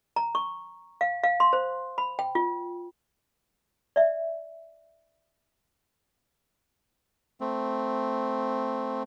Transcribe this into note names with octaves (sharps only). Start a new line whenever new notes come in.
A#5
C#6
F5
F5
C6
C5
B5
G5
F4
D5 E5
A3 C4